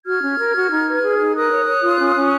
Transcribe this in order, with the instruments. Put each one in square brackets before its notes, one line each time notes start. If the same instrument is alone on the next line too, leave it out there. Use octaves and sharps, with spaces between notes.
[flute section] F#4 F6 G#6
C#4
A#4
F#4
D#4
B4
G#4
D#4
A#4 D#6 F#6
C#5
C#5
F4
C#4
C#4